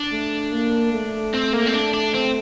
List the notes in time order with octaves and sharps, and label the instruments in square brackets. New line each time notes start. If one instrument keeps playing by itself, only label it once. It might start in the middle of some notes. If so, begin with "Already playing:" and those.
Already playing: [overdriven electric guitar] D4
[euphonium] A3
A#3
A3
[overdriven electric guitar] C4
A#3
C4
D4
D4
C4